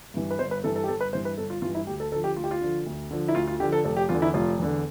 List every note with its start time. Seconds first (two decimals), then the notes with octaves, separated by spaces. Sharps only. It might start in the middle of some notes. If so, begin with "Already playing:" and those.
0.14 G2 E3
0.31 B4
0.39 G1 C5
0.51 B4
0.63 G2 E3 A4
0.76 A4
0.84 G4
0.88 G1 A4
1.01 B4
1.13 G2 E3 C5
1.25 B4
1.37 G1 A4
1.50 F4
1.62 G2 E3 F4
1.75 E4
1.87 D2 G4
2.00 A4
2.12 D3 A4
2.15 F3
2.24 G4
2.36 D2 F4
2.44 G4
2.51 F4
2.61 D3 F3
2.86 D2
3.11 D3 F3
3.28 E4
3.35 D2 F4
3.47 F4
3.60 D3 F3 G4
3.72 A4
3.84 F1 A4
3.97 G4
4.09 E2 D3 F4
4.22 E4
4.34 F1 F4
4.59 E2 D3